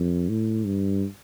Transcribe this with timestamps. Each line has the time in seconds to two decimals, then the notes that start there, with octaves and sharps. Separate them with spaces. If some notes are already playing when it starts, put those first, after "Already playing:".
Already playing: F2
0.29 A2
0.66 G2